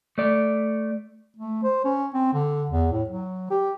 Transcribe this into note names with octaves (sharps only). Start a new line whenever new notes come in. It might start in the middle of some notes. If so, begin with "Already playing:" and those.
A3 D5
A3
C5
C#4
C4
D3
E2
A2
F#3
G4